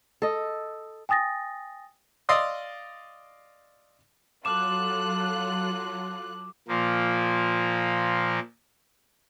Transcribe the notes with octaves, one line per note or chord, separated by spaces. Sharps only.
A4 D#5
G5 G#5 D#6 A6 A#6
D5 D#5 F5 C6 D#6 E6
F#3 F4 A4 D6 F#6 E7
A#2 F3 A#3